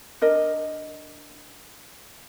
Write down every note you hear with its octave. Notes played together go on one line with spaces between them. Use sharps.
D4 A#4 D#5